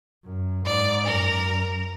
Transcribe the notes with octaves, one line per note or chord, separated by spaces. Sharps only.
F#2
G#2 D5
F#2 A#4